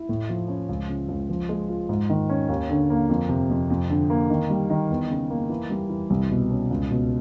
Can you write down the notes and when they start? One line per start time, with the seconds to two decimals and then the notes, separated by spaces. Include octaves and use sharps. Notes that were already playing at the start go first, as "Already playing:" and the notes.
Already playing: E4
0.09 A2
0.29 F3
0.48 C#4
0.69 C#2
0.89 C#3
1.08 C#2
1.29 F3
1.49 G#3
1.69 F4
1.89 G#2
2.09 D#3
2.29 C#4
2.49 D#2
2.70 D3
2.90 A#3
3.09 F2
3.29 C3
3.49 F2
3.70 F2
3.90 D3
4.10 A#3
4.30 D#3
4.50 G3
4.70 D#3
4.90 E2
5.10 C#3
5.30 A#3
5.49 E3
5.70 G3
5.89 E3
6.10 C2
6.31 B2
6.51 C#4
6.71 C#2
6.91 B2